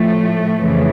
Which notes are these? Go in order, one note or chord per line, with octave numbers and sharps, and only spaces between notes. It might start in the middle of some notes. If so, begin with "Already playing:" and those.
Already playing: A2 F3 A3
F2 C#3 E3